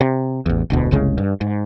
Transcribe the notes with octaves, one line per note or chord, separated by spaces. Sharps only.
C3
A1 E2
E1 D2 B2
F#1 C2 C#3 G#3
G2
G#2